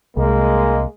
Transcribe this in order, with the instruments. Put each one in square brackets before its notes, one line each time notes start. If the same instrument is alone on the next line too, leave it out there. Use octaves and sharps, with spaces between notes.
[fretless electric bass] C2 [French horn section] G#3 [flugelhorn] A#3